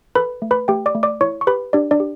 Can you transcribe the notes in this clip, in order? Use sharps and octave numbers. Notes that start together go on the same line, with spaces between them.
A4 B4 B5
A3
B4 B5
A3 G4 G5
D5 D6
A3
D5 D6
E4 C#5 C#6
C#6
G4 B4 B5
D4 G4 D5
D4 D5
G4